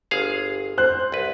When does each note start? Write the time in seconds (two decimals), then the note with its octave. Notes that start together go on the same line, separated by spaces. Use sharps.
0.11 G1 G#4 F5
0.78 C5 F#6
1.12 C2 B4